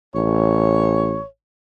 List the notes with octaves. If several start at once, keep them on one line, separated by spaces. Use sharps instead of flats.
A1 C#5